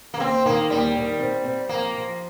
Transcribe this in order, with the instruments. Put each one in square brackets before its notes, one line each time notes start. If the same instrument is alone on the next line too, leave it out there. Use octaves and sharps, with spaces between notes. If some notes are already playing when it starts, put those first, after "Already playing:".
[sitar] A#3
[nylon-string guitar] D#2 [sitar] C4
[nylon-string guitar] D#3 [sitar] A#3
[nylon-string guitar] D#2 [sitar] G3
[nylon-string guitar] D#3
C4
C4
[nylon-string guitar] F3 [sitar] A#3
[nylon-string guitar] F3